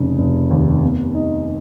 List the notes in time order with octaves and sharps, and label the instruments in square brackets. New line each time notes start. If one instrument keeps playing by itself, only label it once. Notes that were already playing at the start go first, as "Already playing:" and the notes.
Already playing: [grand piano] F1 C#3
F1
D#2
B3
D#4